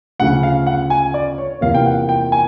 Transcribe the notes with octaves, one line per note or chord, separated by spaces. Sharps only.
D2 C#3 F3 F#5
F5
F#5
G#5
D5
C#5
E2 C3 F3 A#3 F5
G5
F#5
G5
G#5